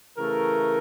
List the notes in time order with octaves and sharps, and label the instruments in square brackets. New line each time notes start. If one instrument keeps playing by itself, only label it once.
[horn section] C#3 E3 A3 A#4